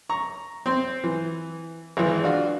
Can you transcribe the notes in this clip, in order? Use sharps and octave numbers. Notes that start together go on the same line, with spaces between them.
A#5 C#6
C4 C6
E3
G#1 E3 G#3
D4 F4 F#4